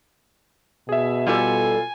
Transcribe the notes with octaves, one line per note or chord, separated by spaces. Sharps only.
B2 G#4 E5
G3 F4 G4 A4 G#5